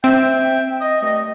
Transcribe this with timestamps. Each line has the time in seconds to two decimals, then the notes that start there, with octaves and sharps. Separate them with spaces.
0.04 C4 E5 G5
0.81 D#5
1.02 G2 A3 D#5